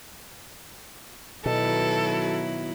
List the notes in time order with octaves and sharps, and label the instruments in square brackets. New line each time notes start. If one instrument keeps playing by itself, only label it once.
[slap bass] B2 [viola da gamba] D#3 F#3 E4 [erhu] A4